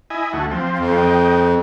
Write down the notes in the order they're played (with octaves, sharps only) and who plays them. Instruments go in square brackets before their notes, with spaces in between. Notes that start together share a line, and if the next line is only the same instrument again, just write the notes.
[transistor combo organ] E4 D#5 G#5
D2 A3 F#4
F3 C4
[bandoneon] F2
[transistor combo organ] D#5 G5